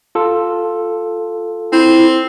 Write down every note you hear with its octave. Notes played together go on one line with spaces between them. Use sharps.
F4 A4
C4 E4